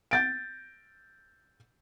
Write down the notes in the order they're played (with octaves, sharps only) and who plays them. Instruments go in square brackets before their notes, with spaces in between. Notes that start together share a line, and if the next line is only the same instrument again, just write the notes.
[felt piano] G6 A6 D7